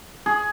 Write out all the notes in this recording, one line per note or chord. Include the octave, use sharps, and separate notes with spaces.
G#4